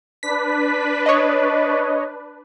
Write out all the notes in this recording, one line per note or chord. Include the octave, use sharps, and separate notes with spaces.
D4 B4 B6
C#5 D#5